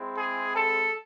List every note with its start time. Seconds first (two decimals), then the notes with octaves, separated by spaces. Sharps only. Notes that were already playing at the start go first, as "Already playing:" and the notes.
Already playing: G#3 C4 E4
0.18 G#4
0.54 A4